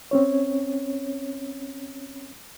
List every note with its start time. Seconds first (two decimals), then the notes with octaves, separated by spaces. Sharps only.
0.11 C4 C#4 C#5